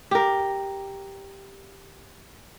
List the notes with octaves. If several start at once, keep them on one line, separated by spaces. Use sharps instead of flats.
G4 A#4